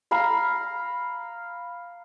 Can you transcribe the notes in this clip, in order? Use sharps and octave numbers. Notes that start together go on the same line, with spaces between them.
F5 A#5 B5